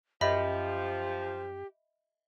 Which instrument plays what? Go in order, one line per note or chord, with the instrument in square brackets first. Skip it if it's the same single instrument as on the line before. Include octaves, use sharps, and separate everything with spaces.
[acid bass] F#2 [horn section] F3 [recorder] G4 [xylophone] D#5 E5 B5